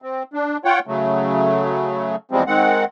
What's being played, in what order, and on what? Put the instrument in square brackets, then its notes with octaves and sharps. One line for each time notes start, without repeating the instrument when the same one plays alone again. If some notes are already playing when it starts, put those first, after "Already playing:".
[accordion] C4
D4
F4 C#5 F#5 G5
C#3 F#3 A3
E2 F3 G3 G#3 C4
D#3 G#3 C4 F#5